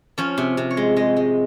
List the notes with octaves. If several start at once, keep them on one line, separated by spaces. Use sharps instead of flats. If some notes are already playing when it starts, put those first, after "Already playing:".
F3 C#4
C3
C3
C#5
G#3
G#3 D#5
G#3